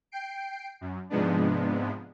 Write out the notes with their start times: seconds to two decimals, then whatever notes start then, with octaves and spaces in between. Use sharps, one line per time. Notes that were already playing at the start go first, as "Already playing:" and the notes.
0.11 G5 C7 D7
0.81 F#2
1.10 G#2 C3 F3 G#3 B3 D4